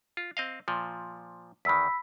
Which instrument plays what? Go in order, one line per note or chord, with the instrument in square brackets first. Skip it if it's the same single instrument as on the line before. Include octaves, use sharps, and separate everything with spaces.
[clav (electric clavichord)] F4
C4 D#5 F5
A#2 F3
[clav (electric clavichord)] E2 D#3 [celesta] B5 E6 B6